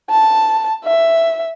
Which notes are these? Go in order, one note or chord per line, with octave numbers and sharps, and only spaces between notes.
A5
E5